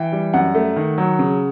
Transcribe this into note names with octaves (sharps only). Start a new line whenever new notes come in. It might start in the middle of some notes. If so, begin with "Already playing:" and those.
Already playing: E3 G5
G3
F#2 F#5
A3
D#3
F#3
C#3